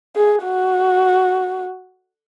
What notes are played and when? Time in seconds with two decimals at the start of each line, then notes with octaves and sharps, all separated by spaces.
0.16 G#4
0.43 F#4